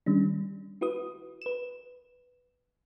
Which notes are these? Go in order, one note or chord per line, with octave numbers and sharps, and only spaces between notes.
D#3 G3 C#4 D4
E4 F#4 B4 D#6
B4 E7